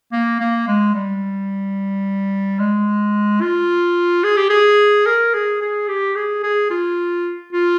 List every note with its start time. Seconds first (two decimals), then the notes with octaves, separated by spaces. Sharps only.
0.12 A#3
0.40 A#3
0.68 G#3
0.94 G3
2.59 G#3
3.41 F4
4.24 G#4
4.37 G4
4.50 G#4
5.06 A#4
5.34 G#4
5.61 G#4
5.88 G4
6.16 G#4
6.43 G#4
6.70 F4
7.53 F4